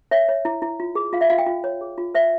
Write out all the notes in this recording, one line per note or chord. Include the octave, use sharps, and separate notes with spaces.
C#5 E5
C#5
E4
E4
F4
G#4
F4 F5
E5
F4 F5
G5
F4
C#5
G#4
F4
C5 E5